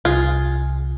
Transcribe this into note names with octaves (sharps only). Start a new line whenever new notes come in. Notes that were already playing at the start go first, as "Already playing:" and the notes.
C2 F4 G#4